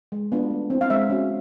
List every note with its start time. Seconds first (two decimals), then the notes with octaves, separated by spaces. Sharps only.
0.12 G#3
0.32 B3 D4 F4
0.50 A3
0.70 C4 E4
0.81 F5
0.90 G#3 E5
1.10 C#4 F#4